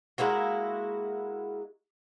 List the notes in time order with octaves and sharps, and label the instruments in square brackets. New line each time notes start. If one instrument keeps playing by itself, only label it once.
[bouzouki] G#3 A#3 E4 F#4